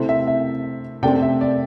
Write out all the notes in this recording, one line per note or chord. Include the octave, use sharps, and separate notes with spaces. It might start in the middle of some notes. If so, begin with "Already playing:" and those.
Already playing: C3 A3 C4 E4
E5
E5
C3 A3 C4 D5 G5
E5
D5